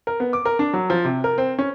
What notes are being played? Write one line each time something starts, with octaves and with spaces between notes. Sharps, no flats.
A#4
B3
D6
A#4
D4
F#3
F3
C3
A#4
C4
C#4